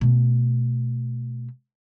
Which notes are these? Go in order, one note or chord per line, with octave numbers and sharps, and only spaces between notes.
B2 A3